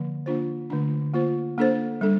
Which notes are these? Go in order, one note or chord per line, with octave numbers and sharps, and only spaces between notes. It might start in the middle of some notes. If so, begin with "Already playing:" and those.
Already playing: D3 F3 A#3
A#3 D4 F4 C5
D3 A3 D4
A#3 F4 C5
A#3 D4 A4 C5
G3 D4 A4